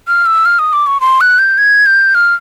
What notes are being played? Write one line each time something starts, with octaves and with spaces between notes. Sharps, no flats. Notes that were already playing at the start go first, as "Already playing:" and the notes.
F6
E6
F6
D#6
D6
C#6
C6
F#6
G6
G#6
G6
F6